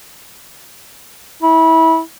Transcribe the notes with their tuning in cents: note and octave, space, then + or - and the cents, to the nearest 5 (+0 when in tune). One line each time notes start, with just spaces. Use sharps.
E4 -25